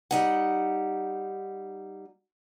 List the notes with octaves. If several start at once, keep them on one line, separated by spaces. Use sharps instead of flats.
G3 D#4 F#5